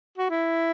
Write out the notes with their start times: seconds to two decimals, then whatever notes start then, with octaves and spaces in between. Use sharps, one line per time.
0.18 F#4
0.30 E4